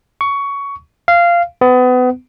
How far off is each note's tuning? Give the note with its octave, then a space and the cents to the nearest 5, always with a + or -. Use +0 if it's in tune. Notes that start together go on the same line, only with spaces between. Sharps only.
C#6 +15
F5 -15
B3 +30